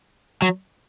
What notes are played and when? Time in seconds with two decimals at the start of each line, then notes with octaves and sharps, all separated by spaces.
0.42 F#3